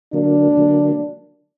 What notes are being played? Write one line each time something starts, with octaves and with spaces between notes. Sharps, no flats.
D3 F#3 A#3 D4
D3 F#3 A#3